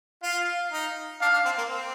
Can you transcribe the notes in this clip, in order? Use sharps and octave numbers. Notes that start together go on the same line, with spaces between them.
F4 F5
D#4
D4 F5
D4
C4
A#3
C4